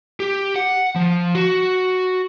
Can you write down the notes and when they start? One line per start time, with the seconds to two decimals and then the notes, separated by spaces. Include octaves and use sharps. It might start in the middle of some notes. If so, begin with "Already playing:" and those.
0.20 G4
0.56 F#5
0.96 F3
1.35 F#4